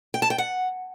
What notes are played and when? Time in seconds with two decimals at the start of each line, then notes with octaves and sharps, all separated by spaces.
0.14 G5
0.22 A5
0.30 G5
0.38 F#5